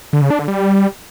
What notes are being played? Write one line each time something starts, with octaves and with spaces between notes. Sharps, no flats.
D3
C#3
D4
D3
G3